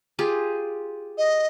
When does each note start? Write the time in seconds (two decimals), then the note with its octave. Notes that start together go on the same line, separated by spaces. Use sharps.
0.19 F4 G4 G#4
1.17 D#5